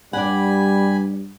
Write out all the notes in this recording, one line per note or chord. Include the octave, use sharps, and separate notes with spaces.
G2 G3 D5 F#5 G#5 B5